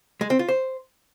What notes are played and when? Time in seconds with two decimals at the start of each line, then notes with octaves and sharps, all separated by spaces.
0.21 G#3
0.30 C4
0.39 F4
0.48 C5